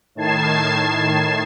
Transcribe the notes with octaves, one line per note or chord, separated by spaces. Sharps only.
A2 D#3 A5 G#6 C7 E7